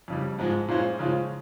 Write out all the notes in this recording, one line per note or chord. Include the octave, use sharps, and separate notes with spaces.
F2 C#3 G3
G#2 F3 G#3
A#2 G#3 C#4 F4 C5
C#3 F3 G#3 C#4 F4